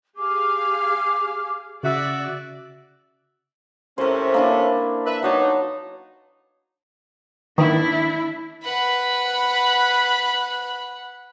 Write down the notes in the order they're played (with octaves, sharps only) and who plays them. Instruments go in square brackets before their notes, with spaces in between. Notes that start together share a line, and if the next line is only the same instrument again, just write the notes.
[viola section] G4 G#4 F5 [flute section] G#5 D6
[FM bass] C#3 [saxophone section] F#4 E5 [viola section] D5
[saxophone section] A2 C3 C#4 [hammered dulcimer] A#4 C5
[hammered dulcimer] A#3 D4 E4
[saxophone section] B4 E5
[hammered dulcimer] F#3 C#5 A5 [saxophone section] B3 D4 D#4
[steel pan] D#3 [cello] D4 E4
[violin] B4 B5 [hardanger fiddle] F#5